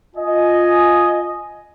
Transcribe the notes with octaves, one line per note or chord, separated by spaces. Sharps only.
F4 D#5 G#5